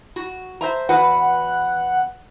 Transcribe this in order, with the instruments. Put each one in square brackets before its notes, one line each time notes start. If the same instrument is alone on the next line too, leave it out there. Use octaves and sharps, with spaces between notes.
[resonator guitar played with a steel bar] F#4
C5 E5 A#5
[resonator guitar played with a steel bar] E2 F#4 B4 [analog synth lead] F#5